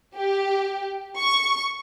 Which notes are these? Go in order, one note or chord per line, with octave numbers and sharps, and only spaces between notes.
G4
C#6